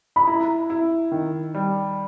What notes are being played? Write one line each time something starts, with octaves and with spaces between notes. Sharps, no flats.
B5
E4 A#5
E4
D#3
G3